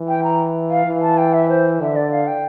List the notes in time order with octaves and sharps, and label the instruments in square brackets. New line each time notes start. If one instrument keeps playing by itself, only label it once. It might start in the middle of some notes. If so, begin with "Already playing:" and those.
Already playing: [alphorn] E3
[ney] G5
A#5
F5
[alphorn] E3
[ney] A5
G5
E5
C5
[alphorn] D3 [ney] E5
[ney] D5
F5
G5